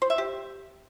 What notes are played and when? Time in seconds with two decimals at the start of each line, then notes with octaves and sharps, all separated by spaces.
0.02 C5
0.10 E5
0.18 G4